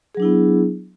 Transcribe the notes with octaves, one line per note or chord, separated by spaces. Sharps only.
F#3 B3 D4 E4 G#4